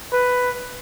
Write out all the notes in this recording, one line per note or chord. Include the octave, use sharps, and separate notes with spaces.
B4